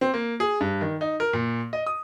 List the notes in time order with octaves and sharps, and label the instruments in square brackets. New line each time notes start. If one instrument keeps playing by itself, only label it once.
[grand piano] C4
A#3
G#4
G2
D#3
D#4
A#4
A#2
D#5
D#6